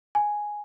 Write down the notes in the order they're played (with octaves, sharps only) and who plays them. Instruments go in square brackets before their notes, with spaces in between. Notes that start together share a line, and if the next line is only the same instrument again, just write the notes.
[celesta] G#5